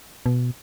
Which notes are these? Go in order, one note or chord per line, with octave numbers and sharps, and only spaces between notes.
B2